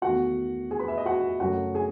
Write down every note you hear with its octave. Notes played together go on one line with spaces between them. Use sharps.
E2 D#3 A3 F#4 F#5
G#4 G#5
B4 B5
E5
D#5
F#4 F#5
F#2 C#3 F#3 A3 F#4 F#5
G#4 G#5